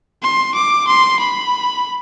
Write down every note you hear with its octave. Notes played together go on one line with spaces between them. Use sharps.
C6
D6
C6
B5